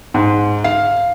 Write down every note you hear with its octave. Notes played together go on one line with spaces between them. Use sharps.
G#2
F5